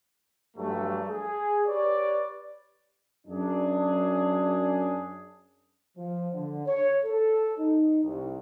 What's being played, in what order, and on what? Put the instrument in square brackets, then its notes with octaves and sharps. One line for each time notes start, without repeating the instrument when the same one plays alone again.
[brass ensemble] G2 F3 F#3 G#3 A3
G#4
G4 B4 C#5 D5
F#2 D4 G#4
F3
D3
C#5
A4
D#4
C2